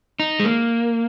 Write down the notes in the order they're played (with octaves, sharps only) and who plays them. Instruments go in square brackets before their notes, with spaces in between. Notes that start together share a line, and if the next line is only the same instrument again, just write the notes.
[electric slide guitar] D#4
G#3
A#3